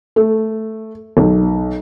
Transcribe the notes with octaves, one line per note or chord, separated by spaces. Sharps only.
A3
B1